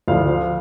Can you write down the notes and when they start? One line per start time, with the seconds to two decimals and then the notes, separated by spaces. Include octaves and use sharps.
0.08 D2 D3 F3 F5